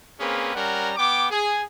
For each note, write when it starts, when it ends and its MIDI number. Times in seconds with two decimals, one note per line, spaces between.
0.20 0.51 58
0.20 0.51 60
0.20 0.51 61
0.20 0.51 68
0.20 0.51 71
0.54 0.92 55
0.54 0.92 61
0.54 0.92 70
0.54 0.92 78
0.54 0.92 82
0.97 1.27 59
0.97 1.27 79
0.97 1.27 86
1.31 1.62 68